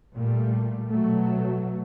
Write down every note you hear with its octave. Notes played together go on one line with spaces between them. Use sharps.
A#2 G3 A3
B2 F#3 A3